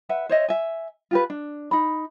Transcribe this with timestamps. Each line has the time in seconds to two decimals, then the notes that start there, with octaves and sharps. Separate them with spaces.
0.09 B4 E5 F#5
0.29 C5 C#5 D#5 E5
0.48 E5 G#5
1.11 F4 G4 B4
1.30 D4
1.71 D#4 B5